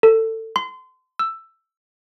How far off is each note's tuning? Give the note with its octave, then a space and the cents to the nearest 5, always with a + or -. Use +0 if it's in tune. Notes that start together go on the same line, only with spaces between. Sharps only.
A4 +25
C6 -30
E6 +10